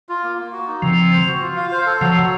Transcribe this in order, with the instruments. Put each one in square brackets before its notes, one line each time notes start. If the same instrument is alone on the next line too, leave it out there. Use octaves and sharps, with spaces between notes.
[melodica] F4
A#3
A#3
F#4
D#4
[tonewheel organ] C#3 F3 [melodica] C4
[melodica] C4
C5
F#4
F4
F5
C5
A4
[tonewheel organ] C#3 F3 [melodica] F#3
[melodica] F#3